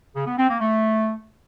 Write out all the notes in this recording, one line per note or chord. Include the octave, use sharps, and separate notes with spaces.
C#3
B3
C4
A#3
A3